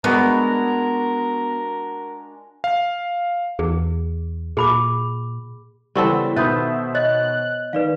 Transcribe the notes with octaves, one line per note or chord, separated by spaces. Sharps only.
G#3 B3 D4 F#4 A#4
F5
E2 G#4
A#2 G#4 B5 D6
C#3 E3 G3 B3 C4 A4 D5 C#6
B2 D#3 B4 C5 E5 D#6 G6 A6
C#5 D#5 F#6 A6
D#3 B4 D5 F5